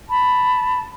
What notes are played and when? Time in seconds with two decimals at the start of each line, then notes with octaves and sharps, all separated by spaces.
0.09 A5 B5